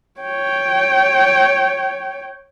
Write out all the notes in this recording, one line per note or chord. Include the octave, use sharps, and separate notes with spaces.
C#5 G5